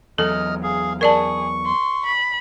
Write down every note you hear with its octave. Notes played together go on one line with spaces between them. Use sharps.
E2 F#3 A4 D#5 F6
G#4 F5
G#4 A#4 D5 A5 C#6
C6
B5